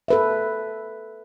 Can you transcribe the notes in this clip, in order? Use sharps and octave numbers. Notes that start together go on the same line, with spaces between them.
A4 B4 E5